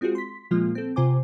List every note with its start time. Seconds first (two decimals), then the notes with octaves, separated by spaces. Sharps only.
0.01 G#3 C4 F4 F#4 G#4
0.15 C6 B6
0.51 A#2 F3 G#3 A#3 F4
0.75 C4 A4
0.96 C3 F4 C5 G#5 D6